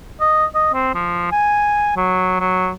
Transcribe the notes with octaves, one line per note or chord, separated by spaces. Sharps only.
D#5
D#5
C4
F3
G#5
F#3
F#3